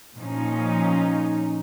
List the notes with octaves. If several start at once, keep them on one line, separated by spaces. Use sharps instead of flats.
A#2 F3 C#4 D#4